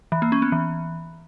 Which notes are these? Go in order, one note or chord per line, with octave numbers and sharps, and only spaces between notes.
E3
A#3
C#4
B3
E3